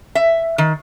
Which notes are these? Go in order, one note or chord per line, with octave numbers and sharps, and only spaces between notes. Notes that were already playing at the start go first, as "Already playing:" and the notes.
E5
D#3